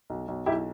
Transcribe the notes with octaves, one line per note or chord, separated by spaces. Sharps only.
B1
B1
B1 E4 G4